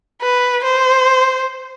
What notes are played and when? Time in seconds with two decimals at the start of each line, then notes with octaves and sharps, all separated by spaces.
0.22 B4
0.64 C5